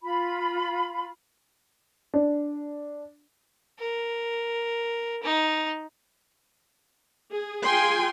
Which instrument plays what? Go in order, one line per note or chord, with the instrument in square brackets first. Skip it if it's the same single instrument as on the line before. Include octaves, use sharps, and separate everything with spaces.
[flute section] F4 B5
[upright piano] D4
[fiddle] A#4
D#4
[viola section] G#4
F4 G#4 G5 G#5 C6